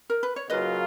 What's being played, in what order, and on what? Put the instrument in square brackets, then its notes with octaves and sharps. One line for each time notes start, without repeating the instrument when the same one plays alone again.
[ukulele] A#4
B4
C#5
[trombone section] C#3 F#3 A#3 F4 [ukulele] B4 D#5